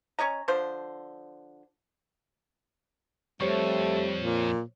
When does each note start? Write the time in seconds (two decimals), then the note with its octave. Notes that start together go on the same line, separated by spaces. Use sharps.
0.19 C#4 C#5 D#5 A#5
0.48 D3 F3 C5
3.41 F2 G3 A3 C5 C#5 C#6
4.19 A#2